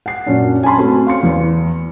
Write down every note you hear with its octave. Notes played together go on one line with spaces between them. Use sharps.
F#5 C7
F#2 A#2 F#3 C#4 D4
G#5 A5 B5 C6
A3 C4 C#4 F#4
F5 C6 C#7
E2